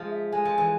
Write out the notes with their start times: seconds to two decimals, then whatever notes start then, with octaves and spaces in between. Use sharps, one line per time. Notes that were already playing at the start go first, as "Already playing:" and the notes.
Already playing: F3 G#3
0.11 E5
0.32 G#3 G#5
0.45 F3
0.58 E3